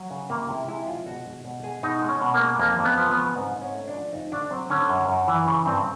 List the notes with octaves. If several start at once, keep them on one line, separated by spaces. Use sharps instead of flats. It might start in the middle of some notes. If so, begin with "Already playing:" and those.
Already playing: F#3
C#3
C3 A#3
C3 E4
G#3 E4
F3 F4
B2 F#4
G#3
B2
G#3 G#4
B2 D#4
G#3
C#4
B2
A#3
G#3
F2 A#3
F2
B3
F3
B3
C#3
G#2 C4
G#2
C#4
A3
D4
F3
F2 D#4
A3 D4
F#3 C4
D3 C#4
F#2
F#2
E3
C#3
G2 C4